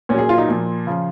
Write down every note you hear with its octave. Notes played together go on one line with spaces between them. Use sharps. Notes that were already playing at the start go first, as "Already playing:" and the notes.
A#2 F#3 C#4 G#4
F4
D#4
A#2 F3
C#3 F3